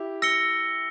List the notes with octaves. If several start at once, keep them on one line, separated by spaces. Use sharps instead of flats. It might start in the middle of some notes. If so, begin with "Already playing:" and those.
Already playing: E4 G4
E6 A#6 C#7 G7